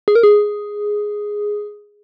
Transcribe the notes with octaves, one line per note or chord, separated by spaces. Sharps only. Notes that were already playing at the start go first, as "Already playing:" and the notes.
G#4
A#4
G#4